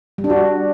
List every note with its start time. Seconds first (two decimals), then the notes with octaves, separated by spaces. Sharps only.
0.18 G3
0.24 D4
0.30 F#4